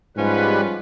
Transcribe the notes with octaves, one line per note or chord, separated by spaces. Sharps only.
G#2 F3 G3 C#4 F4 B4